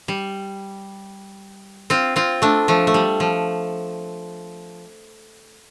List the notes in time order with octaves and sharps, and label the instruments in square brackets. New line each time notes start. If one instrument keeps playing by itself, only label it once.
[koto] G3
C4 F4
C4 F4
A3 D4
F3 A3
A3
G3
F3